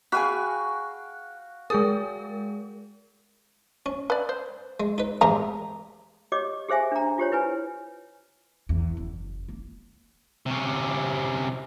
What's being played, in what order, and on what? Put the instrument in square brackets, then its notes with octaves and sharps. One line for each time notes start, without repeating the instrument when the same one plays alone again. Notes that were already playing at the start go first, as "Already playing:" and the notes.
[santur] F#4 F5 G5 [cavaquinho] G#4 G#5 B5 [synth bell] F#6
[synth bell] G#3 G#4 A#4 [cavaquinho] D#6
[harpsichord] C#4
[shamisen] B4 D5
C5
[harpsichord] G#3
D#4 B4
[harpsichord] E2 A2 G#3 [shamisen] G4 A#5
[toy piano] G4 C#5 D#5 D6
G4 G#4 C5 E5 G#5
D4 A#5
F4 G4 C5 C#5
E4 B4 C#5 G#5
[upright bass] E2
F#1
A#3
[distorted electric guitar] C3 C#4